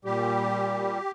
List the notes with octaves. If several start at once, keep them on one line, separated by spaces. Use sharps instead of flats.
A#2 G3 G4